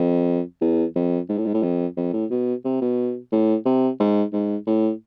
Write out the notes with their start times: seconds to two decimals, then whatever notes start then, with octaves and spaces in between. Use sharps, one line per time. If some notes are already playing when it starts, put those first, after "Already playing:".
Already playing: F2
0.61 E2
0.96 F2
1.29 G#2
1.38 A2
1.46 G#2
1.54 A2
1.63 F2
1.97 F2
2.13 A2
2.30 B2
2.65 C3
2.81 B2
3.32 A2
3.65 C3
4.00 G#2
4.33 G#2
4.67 A2